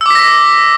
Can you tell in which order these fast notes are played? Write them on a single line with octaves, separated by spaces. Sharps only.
E6 D6 B6 A#6